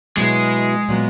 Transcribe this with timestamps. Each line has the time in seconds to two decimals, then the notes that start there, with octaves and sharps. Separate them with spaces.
0.17 B2 F#3 G#3 B3 E4
0.89 A#2 F#3 B3